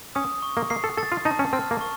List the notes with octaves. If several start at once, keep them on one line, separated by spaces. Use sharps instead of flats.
C#4 D#6
C#6
A#3
A#3 C7
A4
A4 A6
F4
D#4 A5
C#4
C4 F6
A#3
C#6